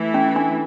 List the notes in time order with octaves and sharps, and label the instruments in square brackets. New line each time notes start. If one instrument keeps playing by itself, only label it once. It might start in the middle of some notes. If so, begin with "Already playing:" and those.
Already playing: [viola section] E3 A3 E4
[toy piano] C#4
D4